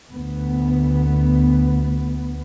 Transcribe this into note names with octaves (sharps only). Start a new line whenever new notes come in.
D2 B3